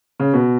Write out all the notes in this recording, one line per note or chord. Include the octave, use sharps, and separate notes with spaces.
C#3
B2